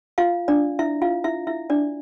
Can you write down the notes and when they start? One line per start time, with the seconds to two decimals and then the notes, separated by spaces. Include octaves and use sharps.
0.18 F4 F5
0.48 D4 D5
0.79 E4 E5
1.02 F4 F5
1.24 E4 E5
1.47 E4 E5
1.70 D4 D5